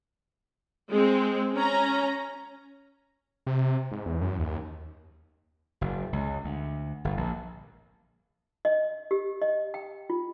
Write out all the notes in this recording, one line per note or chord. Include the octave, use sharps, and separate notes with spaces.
G#3 C4
C#4 A#5
C3
G#2
E2
F#2
D#2
F#1
C#2
D2
G1
A#1
D#5
G4
D#5
G5
F4